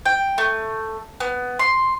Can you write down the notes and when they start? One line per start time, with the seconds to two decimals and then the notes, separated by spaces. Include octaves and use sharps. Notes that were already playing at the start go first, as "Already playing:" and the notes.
0.06 G5
0.38 A3
1.20 B3
1.59 C6